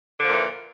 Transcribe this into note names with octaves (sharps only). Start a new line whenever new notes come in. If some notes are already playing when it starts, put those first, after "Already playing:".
A#2 D3 E3 F3